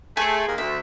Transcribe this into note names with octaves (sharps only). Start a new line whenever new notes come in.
A3 G#4 C5
D#2 A#3
D2 E5